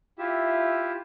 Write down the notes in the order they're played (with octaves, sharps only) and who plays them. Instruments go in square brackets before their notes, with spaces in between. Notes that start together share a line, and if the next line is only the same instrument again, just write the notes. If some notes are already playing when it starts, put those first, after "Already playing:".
[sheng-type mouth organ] E4 F4 G4 E5